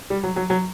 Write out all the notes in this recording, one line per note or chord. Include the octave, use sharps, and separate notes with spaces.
G3
F#3
F#3
F#3